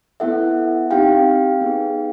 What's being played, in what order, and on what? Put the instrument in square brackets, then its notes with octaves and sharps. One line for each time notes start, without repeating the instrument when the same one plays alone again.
[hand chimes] B3 E4 A4 E5 F#5
C4 D#4 G4 F5 G5
B3 D#4 G#4